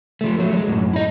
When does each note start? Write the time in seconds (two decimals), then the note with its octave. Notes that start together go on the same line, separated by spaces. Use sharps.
0.21 F3 A3
0.39 F#3 A3
0.53 F#3 G#3
0.68 F#2 A2
0.93 E4 D#5